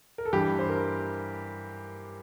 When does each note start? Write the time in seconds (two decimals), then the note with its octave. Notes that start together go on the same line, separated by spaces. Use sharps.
0.18 A#4
0.25 A4
0.33 G2 E3 G4
0.59 C5
0.70 A#4